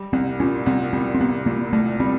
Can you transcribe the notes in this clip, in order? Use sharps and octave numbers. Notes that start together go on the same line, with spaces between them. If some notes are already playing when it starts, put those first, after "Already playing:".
Already playing: G3
C2 C4
A#2 C#4
C2 C4
G3 C4
C4
C2 B3
A#2 A#3
C2 A3
G3 C4